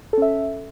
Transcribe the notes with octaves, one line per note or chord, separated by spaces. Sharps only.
C#4 A4 E5